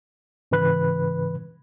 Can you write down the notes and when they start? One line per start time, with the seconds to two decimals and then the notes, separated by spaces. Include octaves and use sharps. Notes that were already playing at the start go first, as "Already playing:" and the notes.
0.51 G#2 C#3 E3 B4 B5 F#6